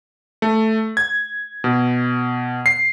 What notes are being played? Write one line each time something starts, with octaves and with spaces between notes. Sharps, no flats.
A3
G#6
B2
C7